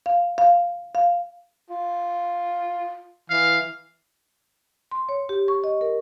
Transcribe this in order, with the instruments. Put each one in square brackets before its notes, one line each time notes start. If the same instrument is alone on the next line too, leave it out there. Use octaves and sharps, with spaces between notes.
[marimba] F5
F5
F5
[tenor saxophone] F4
[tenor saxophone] E3 [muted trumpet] F5
[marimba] C6
C#5
G4
C#6
D#5
A#4